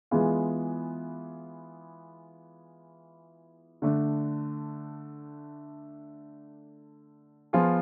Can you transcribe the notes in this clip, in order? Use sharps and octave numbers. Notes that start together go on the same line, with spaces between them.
E3 G#3 B3 F4 G#4
D3 A3 D4
F3 B3 F4 G#4